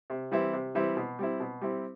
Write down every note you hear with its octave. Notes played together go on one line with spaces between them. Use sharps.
C3
E3 G3 C4 E4
C3
E3 G3 C4 E4
B2
G3 C4 E4
B2
G3 C4 E4